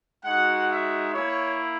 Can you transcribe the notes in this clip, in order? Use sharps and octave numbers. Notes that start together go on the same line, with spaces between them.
G#3 D#4 F#4 F#5
E5
A#3 E4 C#5